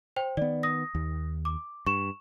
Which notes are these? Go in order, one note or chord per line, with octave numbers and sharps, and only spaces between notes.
C5 G5
D#3 B3 D5
D#6 A#6
D#2
D6
G2 C#6 E7